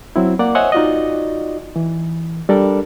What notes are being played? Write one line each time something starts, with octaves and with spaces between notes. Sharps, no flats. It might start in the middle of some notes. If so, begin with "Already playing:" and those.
F#3 C4 E4
A#3 D5 F#5
C5 C#5 D#5 E5 F#5 G#5
D#4 F4 F#4 D5 D#5
E3
G3 D4 A4 A#4 D5